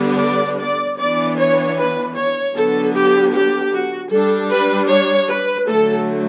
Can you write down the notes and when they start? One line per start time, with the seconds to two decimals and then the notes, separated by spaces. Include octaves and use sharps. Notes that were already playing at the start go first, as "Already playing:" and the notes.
Already playing: D3 G3 B3 D4
0.20 D5
0.59 D5
0.99 E3 B3 D4 D5
1.37 C#5
1.77 B4
2.16 C#5
2.55 D3 F#3 B3 D4 A4
2.94 G4
3.33 G4
3.73 F#4
4.11 G3 D4 A4
4.51 B4
4.90 C#5
5.29 B4
5.68 D3 F#3 A3 A4